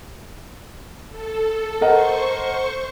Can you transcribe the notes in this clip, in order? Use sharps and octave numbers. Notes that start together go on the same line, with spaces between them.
A4
A#4 C5 D#5 F#5 C#6